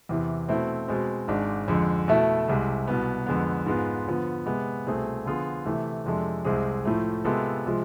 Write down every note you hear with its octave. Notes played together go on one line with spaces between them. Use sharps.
E2 C3 E3
B2 A3 C4 E4
B2 G#3 C4
G#1 G#2 G#3 D4
F2 D3 G#3
B2 A3 E4 A4 E5
C2 C3 G#3
C2 B2 B3
F2 D3 G#3 B3
G#2 G#3 B3 F4
D3 F3 B3
C3 G#3 B3
C2 B2 A3 C4 G#4
D3 F3 B3 F4 G#4
C3 E3 A3
F2 C3 G#3 D4 A4
C2 C3 G#3 C4 G#4
A2 F3 A3
C3 G#3 B3 F4 A4
C3 F3 G#3